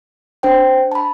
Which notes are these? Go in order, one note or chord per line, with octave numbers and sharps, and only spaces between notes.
D4 C5 G5
A5 B5